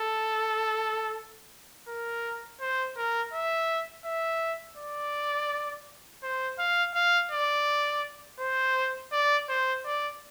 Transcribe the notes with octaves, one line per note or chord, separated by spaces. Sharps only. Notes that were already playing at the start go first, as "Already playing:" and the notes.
Already playing: A4
A#4
C5
A#4
E5
E5
D5
C5
F5
F5
D5
C5
D5
C5
D5